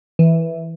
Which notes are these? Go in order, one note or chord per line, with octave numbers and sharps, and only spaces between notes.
E3